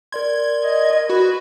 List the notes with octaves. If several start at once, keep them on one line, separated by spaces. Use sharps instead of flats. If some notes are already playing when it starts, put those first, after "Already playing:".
A#4 D5 C6 G#6
D#5
F#4 B4